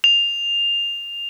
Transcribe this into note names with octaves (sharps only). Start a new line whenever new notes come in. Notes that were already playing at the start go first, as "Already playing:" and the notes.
F7